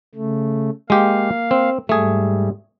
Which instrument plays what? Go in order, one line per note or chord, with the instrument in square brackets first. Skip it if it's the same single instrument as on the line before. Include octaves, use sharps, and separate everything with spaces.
[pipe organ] C#3 A3
[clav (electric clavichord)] G#3 G4 [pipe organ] A#3 F5
[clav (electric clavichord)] C4
[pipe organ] G#2 G3 [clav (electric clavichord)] A3 G#4